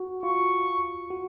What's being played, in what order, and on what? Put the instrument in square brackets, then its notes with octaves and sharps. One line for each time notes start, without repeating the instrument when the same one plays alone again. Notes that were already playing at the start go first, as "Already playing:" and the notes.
Already playing: [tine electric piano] F#4
[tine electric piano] F4 [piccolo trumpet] C#6
[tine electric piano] F#4